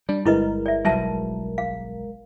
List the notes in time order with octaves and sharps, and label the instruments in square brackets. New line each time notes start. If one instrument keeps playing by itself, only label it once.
[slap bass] G3 [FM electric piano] D4
[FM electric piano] G1 G#3 A#4 [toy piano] E4 B4 D#5
[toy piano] D5 E5
[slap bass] B1 F#3 G3 [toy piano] B4 E5 A5
[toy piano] F5